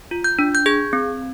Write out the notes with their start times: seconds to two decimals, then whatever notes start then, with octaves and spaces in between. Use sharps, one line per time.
0.11 F4
0.24 G6
0.39 D4
0.55 G6
0.66 G#4 G#6
0.93 C4